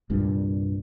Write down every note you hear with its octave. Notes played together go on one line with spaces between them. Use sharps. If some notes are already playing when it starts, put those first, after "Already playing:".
C2 G2 A#2